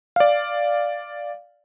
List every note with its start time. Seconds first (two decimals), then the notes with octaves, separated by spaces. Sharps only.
0.16 D5 F5